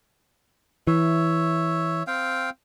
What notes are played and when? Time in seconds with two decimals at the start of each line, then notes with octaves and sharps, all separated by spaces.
0.87 E3 C#5 E5
2.07 C4 F5 G5